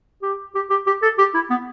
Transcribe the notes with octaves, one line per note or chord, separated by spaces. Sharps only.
G4
G4
G4
G4
A4
G4
E4
B3